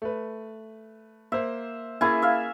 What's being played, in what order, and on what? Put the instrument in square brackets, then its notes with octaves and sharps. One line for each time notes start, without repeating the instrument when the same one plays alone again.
[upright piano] A3 B4
[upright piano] A#3 C5 [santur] E5
[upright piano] A#3 G#4 A6 [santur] C#4 E4 G#5
[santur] E5 F5